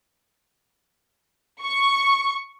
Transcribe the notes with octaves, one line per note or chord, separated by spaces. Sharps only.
C#6